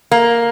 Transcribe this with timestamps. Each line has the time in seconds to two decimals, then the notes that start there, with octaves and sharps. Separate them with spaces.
0.11 A#3